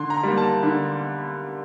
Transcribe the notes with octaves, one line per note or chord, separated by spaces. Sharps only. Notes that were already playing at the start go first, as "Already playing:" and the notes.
Already playing: D3 C6
A#5
G3 A#3
A5
D3